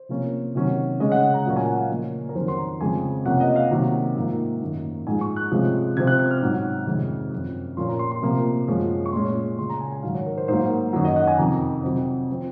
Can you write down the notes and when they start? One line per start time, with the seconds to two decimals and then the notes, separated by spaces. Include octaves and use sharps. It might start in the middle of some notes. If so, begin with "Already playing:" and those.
Already playing: C5
0.09 C3 F3 A#3 C#4
0.55 C3 D#3 F#3 C#4
1.00 C#3 G#3 C#4 D#5
1.12 F#5
1.34 A#5
1.46 A#2 F#3 A#3 C#4
1.56 G#5
1.67 F#5
1.78 F5
1.90 C#3 F3 A#3 C#4
2.29 A#4
2.35 F2 D#3 F#3 C#4 C5
2.48 C6
2.58 A#5
2.81 F2 C#3 G#3 C4 G#5
3.26 C3 F3 A#3 C#4 F#5
3.40 D#5
3.56 F5
3.71 C3 D#3 F#3 A#3
4.16 G#2 F3 A#3
4.62 F#2 D#3 A#3
5.07 G#2 F3 G#3 G#5
5.21 C#6
5.36 F#6
5.52 C3 F3 G#3 C#4
5.97 C3 F3 C4 G#6
6.07 F#6
6.19 F#6
6.31 F6
6.42 G#2 F#3 C#4
6.87 F2 C3 D#3 G#3 C#4
7.33 F#2 F3 C4
7.77 A#2 F3 A#3 C#4 C6
7.89 A#5
7.99 C6
8.11 C6
8.22 C3 F3 A#3
8.68 F#2 F3 G#3 C#4
9.06 C#6
9.12 A#2 G#3 C#4 C6
9.58 C#3 G#3 C#4 C6
9.70 A#5
9.80 G#5
9.92 G#5
10.03 G#2 D#3 F#3 F5
10.15 C#5
10.26 A#4
10.38 C5
10.48 G#2 F#3 A#3 C5
10.93 F#2 D#3 F#3 C#5
11.05 D#5
11.16 F#5
11.27 G#5
11.38 F2 C3 D#3 A#5
11.84 C3 F#3 C4
12.30 F3 C4